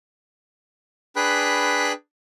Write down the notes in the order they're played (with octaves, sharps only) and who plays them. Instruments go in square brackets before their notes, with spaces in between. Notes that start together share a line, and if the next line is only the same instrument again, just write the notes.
[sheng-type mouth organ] D4 G#4 B4 G5 B5 F#6